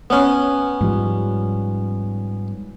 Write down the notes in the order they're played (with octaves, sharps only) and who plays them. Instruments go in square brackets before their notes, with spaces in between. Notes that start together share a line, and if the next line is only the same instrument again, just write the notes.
[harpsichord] B3 C#4
[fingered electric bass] G#2 F3 G3